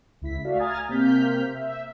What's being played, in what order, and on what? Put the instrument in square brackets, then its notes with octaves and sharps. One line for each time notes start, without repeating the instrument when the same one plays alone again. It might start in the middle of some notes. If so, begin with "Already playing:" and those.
[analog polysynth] C#2 E4 B6
A3 F#4 D5 E5 F5
G#5 A#5 D#6 F6 G#6 A6
C3 A#3 C4 F6 G6 B6
E5